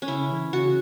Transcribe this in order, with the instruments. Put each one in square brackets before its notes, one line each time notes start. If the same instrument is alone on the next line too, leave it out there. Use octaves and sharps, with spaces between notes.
[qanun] C#4
[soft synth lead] C#3 [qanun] E4
[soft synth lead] C#3
E3
[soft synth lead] C#3 [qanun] F#4